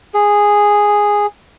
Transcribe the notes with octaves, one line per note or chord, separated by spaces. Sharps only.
G#4